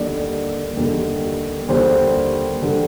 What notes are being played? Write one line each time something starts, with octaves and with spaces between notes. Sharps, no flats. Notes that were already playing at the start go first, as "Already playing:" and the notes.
Already playing: D#2 D3 G3 D5
D#2 D3 G3
D#2 D3 G3 C5
D3 G3